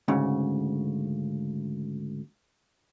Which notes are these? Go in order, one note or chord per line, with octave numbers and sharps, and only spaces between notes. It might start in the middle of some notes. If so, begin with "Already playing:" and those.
D2 G#2 C#3